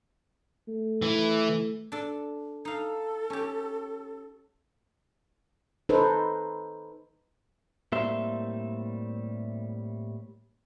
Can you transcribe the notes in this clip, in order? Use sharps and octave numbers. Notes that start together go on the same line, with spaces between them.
A3
E3
D4 A4
D#4 A4 F5
C#4 G4
D#4 A4 B4 C5
A2 G3 A#3 C4 E5 C6